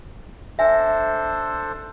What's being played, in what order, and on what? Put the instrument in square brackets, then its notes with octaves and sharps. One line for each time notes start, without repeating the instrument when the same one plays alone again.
[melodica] D4 A4 C5 [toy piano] E5 G#5